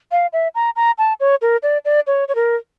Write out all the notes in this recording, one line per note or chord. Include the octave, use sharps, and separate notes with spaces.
F5
E5
A#5
A#5
A5
C#5
A#4
D5
D5
C#5
C#5
A#4